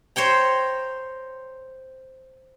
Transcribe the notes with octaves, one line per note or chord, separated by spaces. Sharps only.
C5 C#5 G5 A#5